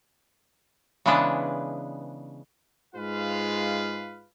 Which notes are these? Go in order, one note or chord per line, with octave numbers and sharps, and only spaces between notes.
C#3 E3 G#3 B3 D4 B4
G#2 G#3 F4 B4 F5